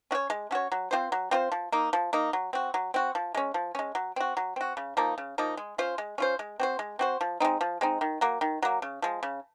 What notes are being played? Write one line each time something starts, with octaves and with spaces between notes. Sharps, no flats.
C#4 F#4 C#5
G#3
C#4 F#4 C#5
F#3
C4 F4 C5
F#3
C4 F4 C5
F3
A#3 D#4
F3
A#3 D#4
F#3
C4 F#4
F#3
C4 F#4
F3
G#3 C#4
F3
G#3 C#4
F#3
C4 F#4
F#3
C4 F#4
C#3
F3 A#3 D#4
C#3
F3 A#3 D#4
G#3
C#4 F4 C5
G#3
C#4 F4 C5
G#3
C4 F#4 C5
G#3
C4 F#4 C5
F3
G#3 C4 D#4
F3
G#3 C4 D#4
D#3
F#3 A#3
D#3
F#3 A#3
C#3
F3 G#3
C#3